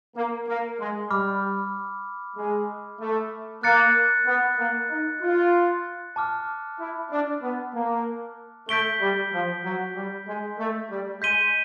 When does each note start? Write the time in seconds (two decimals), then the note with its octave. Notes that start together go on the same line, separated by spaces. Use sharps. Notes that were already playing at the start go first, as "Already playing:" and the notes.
0.16 A#3
0.47 A#3
0.79 G#3
1.10 G3 B5 D6 F6
2.37 G#3
3.00 A3
3.63 A#3 F#6 A6 C#7
4.26 B3
4.58 A#3
4.90 D#4
5.21 F4
6.16 A5 D6 F6
6.79 E4
7.11 D4
7.42 B3
7.74 A#3
8.69 A3 G6 B6 D7 G7
9.01 G3
9.32 F3
9.64 F#3
9.95 G3
10.27 G#3
10.58 A3
10.90 G3
11.21 G#3 G6 B6 D#7 G7